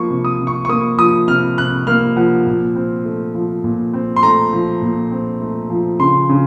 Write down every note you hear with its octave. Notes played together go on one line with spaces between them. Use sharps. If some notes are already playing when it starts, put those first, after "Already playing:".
Already playing: F3 A#3 C#6
C3
D#6
C3
C#6
C#6
A#3 D#6
F3 D#6
C3 F6
C3 F#6
A#3 F6
F3 F#5
A#2
C4
A3
F3
A#2
C4
C6
A3 A#5
F3
A#2
C4
A3
F3
C#3 C6
C#3